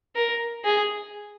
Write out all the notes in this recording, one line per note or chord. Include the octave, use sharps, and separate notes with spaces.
A#4
G#4